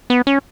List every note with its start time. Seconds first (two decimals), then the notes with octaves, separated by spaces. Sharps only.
0.10 B3
0.27 C#4